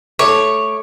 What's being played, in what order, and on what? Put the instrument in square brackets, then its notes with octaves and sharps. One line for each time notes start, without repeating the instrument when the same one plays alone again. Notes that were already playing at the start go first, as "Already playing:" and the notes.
[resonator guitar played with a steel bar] A3 [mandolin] C#5 [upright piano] D6